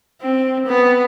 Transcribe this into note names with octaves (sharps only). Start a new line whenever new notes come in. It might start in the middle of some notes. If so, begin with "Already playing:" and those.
C4
B3